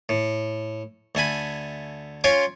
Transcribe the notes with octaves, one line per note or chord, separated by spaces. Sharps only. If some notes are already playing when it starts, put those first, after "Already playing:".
A2
D2 A3 G#5 B5
C#4 F4 C#5 G5 C6 C#6